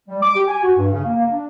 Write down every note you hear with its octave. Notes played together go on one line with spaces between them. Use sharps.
G3
D6
G4
G#5
F#4
G2
C#3
A#3
A#3
D4